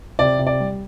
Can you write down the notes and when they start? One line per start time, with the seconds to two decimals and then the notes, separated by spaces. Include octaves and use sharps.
0.19 C3 D5
0.39 C3
0.47 D5
0.60 G3